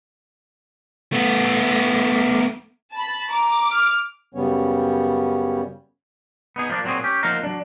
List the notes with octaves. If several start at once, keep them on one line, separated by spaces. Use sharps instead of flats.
A3 B3
A5 B5
A#5 D6
F6
F#2 C#3 G3 B3 C#4 C#5
B3 D#4 G#4
F3 A#3 B3 D4
A#2 F#3 C4 E4 F#4 G#4
C#4 G4
F3 A#3 D#4 F5 F#5 A#5
F#3 D4